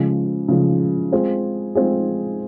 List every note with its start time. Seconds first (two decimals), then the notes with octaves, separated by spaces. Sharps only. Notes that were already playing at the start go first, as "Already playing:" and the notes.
Already playing: C#3 F3 G#3
0.48 C#3 F3 G#3
1.12 G#3 C4 F4 G#4
1.75 G#3 C4 F4 G#4